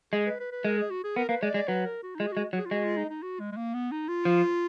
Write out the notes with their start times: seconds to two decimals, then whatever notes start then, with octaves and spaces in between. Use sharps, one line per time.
0.13 G#3 G#4
0.26 B4
0.39 B4
0.52 B4
0.64 G#3 A#4
0.78 G#4
0.90 F#4
1.04 G#4
1.16 B3 A#4
1.29 A#3 B4
1.42 G#3 D5
1.54 G#3 D5
1.68 F#3 B4
1.85 A#4
2.03 F#4
2.15 D#4
2.19 G#3 F4
2.26 G#4
2.32 G#3 F#4
2.53 F#3
2.58 G#4
2.65 F4
2.71 G#3 F#4
2.84 F4
2.97 D#4
3.10 D#4
3.22 F#4
3.40 G#3
3.51 G#3
3.57 A#3
3.74 B3
3.91 D#4
4.08 F4
4.25 F3